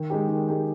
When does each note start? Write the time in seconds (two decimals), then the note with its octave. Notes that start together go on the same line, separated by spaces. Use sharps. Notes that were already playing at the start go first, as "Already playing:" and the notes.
Already playing: D#3
0.10 G#3 D#4 G4
0.29 D#3
0.48 G#3 D#4 G4